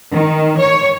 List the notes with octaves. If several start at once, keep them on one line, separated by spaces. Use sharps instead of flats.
D#3
C#5